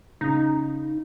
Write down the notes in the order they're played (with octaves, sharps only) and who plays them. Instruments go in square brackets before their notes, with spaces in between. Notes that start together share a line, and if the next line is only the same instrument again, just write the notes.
[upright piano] C#3 [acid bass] D#4